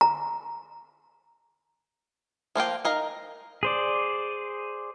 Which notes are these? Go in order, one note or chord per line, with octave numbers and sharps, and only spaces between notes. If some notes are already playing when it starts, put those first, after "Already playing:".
A#5
F3 A#3 F4 G5
D#4 A#4 F5
G#4 C5 D5